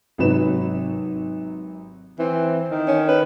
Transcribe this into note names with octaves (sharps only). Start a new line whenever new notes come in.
G#1 C3 F#3 B4 E7
E3 C4
D#3
C#4
B4